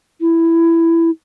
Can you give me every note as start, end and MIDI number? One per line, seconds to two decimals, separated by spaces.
0.21 1.10 64